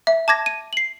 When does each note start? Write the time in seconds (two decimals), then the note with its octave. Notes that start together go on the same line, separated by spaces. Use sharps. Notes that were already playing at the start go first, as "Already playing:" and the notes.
0.07 E5
0.28 A5 D6 G#6 A#6
0.46 D#7
0.73 C7 F#7